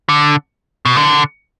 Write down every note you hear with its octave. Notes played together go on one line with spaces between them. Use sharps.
D3
B2
D3